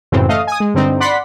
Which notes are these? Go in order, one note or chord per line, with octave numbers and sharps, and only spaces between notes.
F#2 A2 C#3 E3 C4
A3 D#5 F5
G#5 D#6
G#3
G2 D3 C4 D#4
D5 F#5 B5 C6 B6